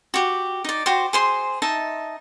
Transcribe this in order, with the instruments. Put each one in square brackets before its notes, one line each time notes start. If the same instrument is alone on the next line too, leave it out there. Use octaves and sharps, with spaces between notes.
[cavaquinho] F#4 G4
D#4 D5
F#4 G4 C5
G#4 C5 C6
D#4 E5 A5